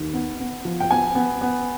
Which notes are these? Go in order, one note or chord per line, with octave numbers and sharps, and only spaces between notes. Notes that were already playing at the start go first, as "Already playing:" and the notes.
Already playing: D#2
B3
B3
F3
G5
B3 G#5
B3
B3